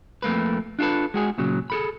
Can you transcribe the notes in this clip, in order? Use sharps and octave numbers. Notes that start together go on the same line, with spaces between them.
F2 A3 A#3 B4
D4 F4 F#4 A4 B4
G#3 F#4 G#4
A#2 C#3 F#3
G#4 A4 B5